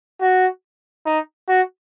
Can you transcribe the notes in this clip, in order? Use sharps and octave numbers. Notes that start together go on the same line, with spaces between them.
F#4
D#4
F#4